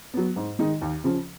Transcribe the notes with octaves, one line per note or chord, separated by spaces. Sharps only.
F#3 B3
G#2
D#3 G#3 D#4
D#2
C#3 F3